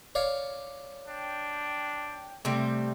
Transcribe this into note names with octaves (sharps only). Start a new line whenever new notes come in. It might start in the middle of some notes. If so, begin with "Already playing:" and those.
C#5 D5 F5
D4 G5
C3 G3 A3 C4